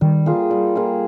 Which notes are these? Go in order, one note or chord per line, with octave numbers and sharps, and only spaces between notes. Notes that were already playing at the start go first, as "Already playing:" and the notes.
D#3 G3
A#3 F4 G#4
G3
A#3 F4 G#4